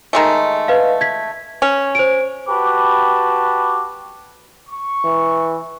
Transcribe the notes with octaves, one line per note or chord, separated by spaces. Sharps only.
D#3 G#3 A3
B4 D#5 F5
G#6 B6
C#4
C5 D7
F#4 G4 B4 A5 B5 D6
C#6
E3